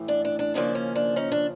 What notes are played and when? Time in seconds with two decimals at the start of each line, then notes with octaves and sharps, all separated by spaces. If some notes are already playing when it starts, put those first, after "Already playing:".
Already playing: A2 E3 A3
0.08 D4
0.25 D4
0.39 D4
0.54 D#2 C#3 F3 A#3 D4
0.75 C#4
0.95 D4
1.16 C#4 D#4
1.32 D4